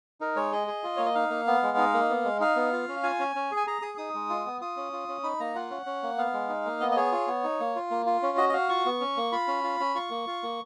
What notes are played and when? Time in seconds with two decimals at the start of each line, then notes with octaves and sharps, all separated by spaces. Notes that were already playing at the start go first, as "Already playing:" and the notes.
0.21 D#4 A#4
0.36 G#3 C#5
0.52 G#4 D#5
0.67 G#4
0.83 F4
0.96 A#3 C#5
1.05 D#5
1.15 D#4 F5
1.30 A#3
1.47 B3
1.63 G#3
1.77 D#4
1.94 A#3
2.10 B3
2.25 G#3
2.40 D#4 F5
2.56 B3
2.73 F4
2.88 C#4
3.03 F4 G#5
3.19 C#4
3.36 C#4
3.51 G#4
3.57 G#5
3.67 G#4 A#5
3.82 G#4 D#6
3.98 D#4 D#6
4.14 G#3
4.30 F4
4.46 B3
4.61 F4 D#6
4.77 C#4
4.93 F4
5.08 C#4
5.23 D#4 B5
5.40 A#3 A#5
5.55 F4 F#5
5.70 C#4
5.86 C#4
6.03 A#3
6.18 B3 F5
6.33 G#3
6.49 D#4
6.65 A#3
6.80 B3 D#5
6.91 D#5
6.96 G#4 C#5
7.12 F4
7.27 B3
7.44 D#4
7.60 A#3
7.75 F4
7.91 A#3
8.06 F4
8.23 C#4
8.37 F#4 D#5
8.49 D#5
8.53 F#4 F5
8.69 F4 C#6
8.86 B3
9.00 C#4
9.17 A#3
9.32 F4 B5
9.47 C#4
9.64 F4
9.80 C#4
9.95 F4 C#6
10.10 A#3
10.27 F4
10.43 A#3